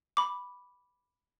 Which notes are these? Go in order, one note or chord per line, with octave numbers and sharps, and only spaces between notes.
B5 D6